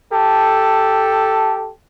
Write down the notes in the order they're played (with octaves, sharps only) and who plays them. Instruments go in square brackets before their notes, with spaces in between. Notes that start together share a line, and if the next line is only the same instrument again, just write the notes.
[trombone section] G4 A4